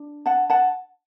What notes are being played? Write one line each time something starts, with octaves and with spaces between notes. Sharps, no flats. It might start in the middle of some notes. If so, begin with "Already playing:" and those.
Already playing: D4
F#5 A5
F#5 A5